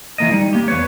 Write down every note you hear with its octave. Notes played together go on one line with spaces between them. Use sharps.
E3 A#3 D#5
G3 D#4
A#3 G4
E2 B4 C#5